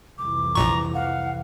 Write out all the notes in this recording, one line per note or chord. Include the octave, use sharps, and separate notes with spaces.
C2 F2 E3 D6
A#1 A#2 A#5 C#6
F5 F#5